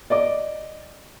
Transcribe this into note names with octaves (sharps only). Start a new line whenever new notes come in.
D5 D#5 D6